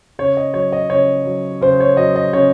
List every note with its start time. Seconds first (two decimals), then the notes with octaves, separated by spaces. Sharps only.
0.19 C#3 C#5
0.37 D#5
0.54 F#3 C#5
0.73 D#5
0.90 C#3 C#5
1.26 F#3
1.61 C#3 C5
1.80 C#5
1.97 F#3 D#5
2.16 D#5
2.33 C#3 C#5